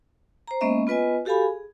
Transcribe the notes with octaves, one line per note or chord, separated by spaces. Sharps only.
C5 A#5
G#3 A#3 B3 C#4 D#5 E5
B3 F4 B4 D#5 G#5
F#4 G4 A4 F5 G#5 B5
G#4